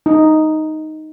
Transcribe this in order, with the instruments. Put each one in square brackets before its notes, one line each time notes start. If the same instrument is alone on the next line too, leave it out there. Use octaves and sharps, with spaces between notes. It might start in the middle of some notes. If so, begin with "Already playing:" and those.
[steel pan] D#4